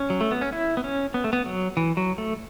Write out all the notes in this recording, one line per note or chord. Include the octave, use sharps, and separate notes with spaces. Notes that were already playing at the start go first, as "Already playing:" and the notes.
Already playing: C#4
F#3
A3
B3
C#4
E4
B3
C#4
B3
A3
B3
F#3
E3
F#3
A3